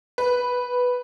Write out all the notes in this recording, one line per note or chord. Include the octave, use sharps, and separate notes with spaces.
B4